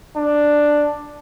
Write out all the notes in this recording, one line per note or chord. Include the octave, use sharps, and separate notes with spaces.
D4